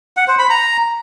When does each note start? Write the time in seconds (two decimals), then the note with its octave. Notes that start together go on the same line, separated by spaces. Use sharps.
0.17 F#5
0.28 C5
0.39 B5
0.50 A#5